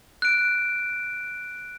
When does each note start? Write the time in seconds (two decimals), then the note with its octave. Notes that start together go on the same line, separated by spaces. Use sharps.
0.22 F#6 D7